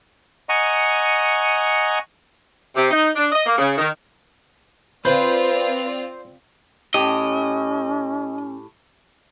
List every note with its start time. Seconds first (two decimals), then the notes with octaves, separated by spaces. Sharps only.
0.49 D#5 F#5 G#5 A#5 C#6
2.76 C3
2.91 D#4
3.16 D4
3.32 D#5
3.47 A#3
3.58 C#3
3.78 D#3
5.05 C4 F4 B4 C5 D5
6.94 A2 C#4 G4 D#5